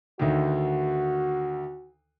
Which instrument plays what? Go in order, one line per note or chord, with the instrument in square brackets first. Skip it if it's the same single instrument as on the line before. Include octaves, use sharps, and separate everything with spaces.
[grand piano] D2 D3 D#3 [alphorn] F#4